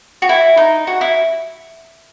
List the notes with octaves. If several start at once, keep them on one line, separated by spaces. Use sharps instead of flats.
F#4
E4
D#4
F#4
E4